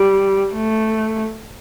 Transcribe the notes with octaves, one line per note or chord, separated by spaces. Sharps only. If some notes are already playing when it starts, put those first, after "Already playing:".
Already playing: G3
A3